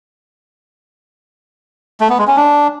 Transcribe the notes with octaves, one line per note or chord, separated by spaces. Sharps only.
A3
B3
G#3
C#4
D4